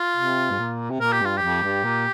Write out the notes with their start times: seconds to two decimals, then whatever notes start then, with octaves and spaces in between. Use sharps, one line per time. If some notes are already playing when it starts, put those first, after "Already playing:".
Already playing: F4
0.17 C3
0.51 G2
0.60 A#2
0.90 C3
1.01 A#2 A#4
1.13 G4
1.21 G2 F4
1.37 G4
1.42 F2
1.63 G2
1.84 A#2